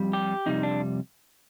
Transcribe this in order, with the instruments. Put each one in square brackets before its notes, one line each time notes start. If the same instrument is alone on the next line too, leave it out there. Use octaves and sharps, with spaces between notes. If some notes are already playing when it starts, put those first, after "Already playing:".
Already playing: [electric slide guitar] F2 G3
G4
F2 C3 G3 D#4
D4